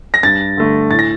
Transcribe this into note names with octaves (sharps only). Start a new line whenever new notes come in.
A#6
G2 A6
D3 A3
A2 A6
A#6